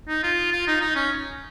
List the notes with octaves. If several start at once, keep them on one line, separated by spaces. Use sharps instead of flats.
D#4
F4
F4
D#4
D#4
C#4